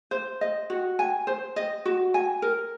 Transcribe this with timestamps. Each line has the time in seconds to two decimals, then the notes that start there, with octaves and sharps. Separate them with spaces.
0.11 C5
0.41 D#5
0.70 F#4
0.99 G#5
1.27 C5
1.56 D#5
1.85 F#4
2.14 G#5
2.42 A#4